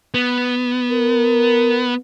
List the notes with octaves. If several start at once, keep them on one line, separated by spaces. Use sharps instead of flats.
B3
A#4